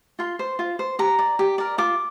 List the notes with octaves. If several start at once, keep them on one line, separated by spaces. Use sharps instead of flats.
F4 C6
C5
F4
C5
G4 A#5
D5
G4
A#4 D5
F4 D6